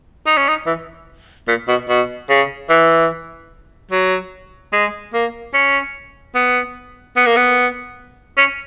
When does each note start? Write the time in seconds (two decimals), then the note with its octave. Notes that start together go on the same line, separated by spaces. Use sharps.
0.27 D#4
0.37 C#4
0.48 D#4
0.67 E3
1.48 A#2
1.68 B2
1.89 B2
2.29 C#3
2.70 E3
3.92 F#3
4.73 G#3
5.14 A#3
5.54 C#4
6.35 B3
7.16 B3
7.26 A#3
7.36 B3
8.38 C#4